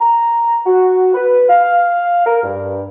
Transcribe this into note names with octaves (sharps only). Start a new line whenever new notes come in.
A#5
F#4
B4
F5
A#4
G2